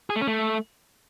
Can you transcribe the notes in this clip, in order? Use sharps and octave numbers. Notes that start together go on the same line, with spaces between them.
G#4
A3
C#4
A3